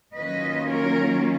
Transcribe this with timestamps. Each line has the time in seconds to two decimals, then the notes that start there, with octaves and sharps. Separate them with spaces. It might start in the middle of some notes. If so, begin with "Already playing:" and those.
0.15 D#3 F#3 A#3 C#4 F4 B4 D#5
0.68 A#4 C#5